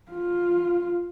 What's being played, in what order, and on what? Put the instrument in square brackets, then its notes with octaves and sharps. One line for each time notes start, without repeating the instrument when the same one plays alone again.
[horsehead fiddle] F4